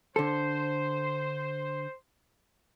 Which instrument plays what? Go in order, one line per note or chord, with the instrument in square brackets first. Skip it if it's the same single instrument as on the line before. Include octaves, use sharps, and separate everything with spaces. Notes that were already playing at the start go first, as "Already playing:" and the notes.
[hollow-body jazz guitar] D3 A4 [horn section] C5